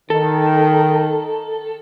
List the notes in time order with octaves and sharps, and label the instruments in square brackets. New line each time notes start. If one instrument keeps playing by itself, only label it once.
[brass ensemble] D#3 [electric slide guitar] A4